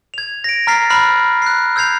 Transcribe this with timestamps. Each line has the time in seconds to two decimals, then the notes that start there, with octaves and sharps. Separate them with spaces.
0.14 G#6 F7
0.44 A#6 D7
0.67 A#5 F6 A6 B6 C7
0.90 A#5 B5 F6 F#6 C7
1.42 F#6 C7
1.76 E6 G6 G#6 C7 F7